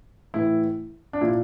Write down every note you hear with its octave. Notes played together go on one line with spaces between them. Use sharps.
A2 E3 E4
D4
A#2 F3 E4